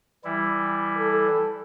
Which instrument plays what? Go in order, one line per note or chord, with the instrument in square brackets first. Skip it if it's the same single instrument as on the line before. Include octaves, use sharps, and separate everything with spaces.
[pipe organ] E3 G3 E4
[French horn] A4